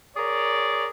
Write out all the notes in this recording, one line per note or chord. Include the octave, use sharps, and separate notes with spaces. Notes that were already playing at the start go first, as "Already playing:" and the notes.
G#4 A#4 C#5 D5